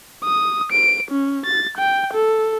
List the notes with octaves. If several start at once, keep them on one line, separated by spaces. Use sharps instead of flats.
D#6
D7
C#4
A6
G5
A4